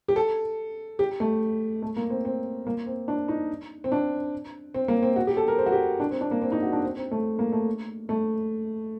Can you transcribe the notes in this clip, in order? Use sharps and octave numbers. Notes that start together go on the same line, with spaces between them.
G4
A4
G4
A3
A3
A#3
C4
C4
A#3
C4
D4
D#4
C4
D4
C4
A#3
C4
F#4
G4
A4
A#4
C5
F#4
G4
D4
C4
D4
A#3
C4
D#4
F#4
D4
C4
C4
A3
A#3
A3
A3